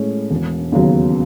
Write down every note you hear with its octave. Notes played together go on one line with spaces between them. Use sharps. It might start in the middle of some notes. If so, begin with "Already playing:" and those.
Already playing: A2 G#3 C#4
E1
D#2 C#3 F#3 B3